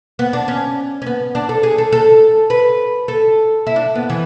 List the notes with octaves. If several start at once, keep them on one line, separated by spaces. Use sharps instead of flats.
B3
D4
C#4
C#4
B3
D4
A4
G#4
A4
A4
B4
A4
E4
D4
B3
E3